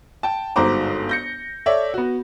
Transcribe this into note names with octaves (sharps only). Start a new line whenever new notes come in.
G5 A5
G1 G#2 F#4 C5 A#5 D6
G6 A#6 C#7
A4 C#5 D5 E5
B3 F#4